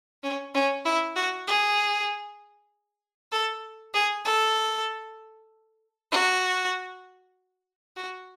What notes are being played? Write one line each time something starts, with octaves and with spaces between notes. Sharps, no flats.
C#4
C#4
E4
F#4
G#4
A4
G#4
A4
F#4
F#4